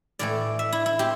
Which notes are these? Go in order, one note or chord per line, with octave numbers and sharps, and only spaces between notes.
A2 E3 A3 D5
E5
E4
E4
C4 G4